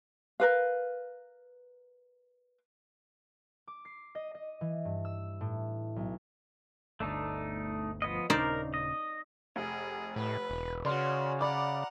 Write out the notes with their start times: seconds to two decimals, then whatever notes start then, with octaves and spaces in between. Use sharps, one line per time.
0.40 A#4 B4 F5
3.67 D6
3.85 C7
4.15 D#5
4.35 D#5
4.61 E3
4.85 G2
5.05 E6
5.41 A2
5.96 B1
7.00 G1 D2 A3 D4 D#4
8.02 F3 B3 D#5
8.30 D#1 C#3 D#4 A#4 C5 D5
8.74 D#5
9.56 F1 G#4
10.16 A2 B4
10.50 E1
10.85 C#3 F#4 C#5 D5 C6 F6
11.41 D5 F#5 A#5 B5 D6